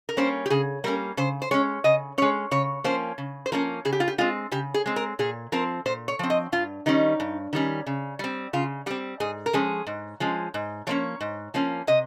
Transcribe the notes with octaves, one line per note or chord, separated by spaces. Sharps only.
A#4
G3 A#3 C#4 C5
G4
C#3 G#4
G3 A#3 C#4 A#4
C#3 C5
C5
G#3 C#4 C#5
C#3 D#5
G#3 C#4 C#5
C#3 C#5
F3 A#3 C#4 C5
C#3
C5
F3 A#3 C#4 A#4
C#3 G#4
G4
F4
G4
G#3 C4 F4
C#3 G4
G#4
G#3 C4
A#4
A#2 G#4
F3 C4 A#4
A#2 C5
C#5
F3 C4
D#5
G2 F4
D#3 G3 C#4 D#4
G2
D#3 G3 C#4
C#3
G3 C4
C#3 F4
G3 C4 G4
G#2 G#4
A#4
F3 G#3 C#4 G#4
G#2
F3 G#3 C#4
G#2
F3 A#3 C#4 C#5
G#2
F3 A#3 C#4
C3 D#5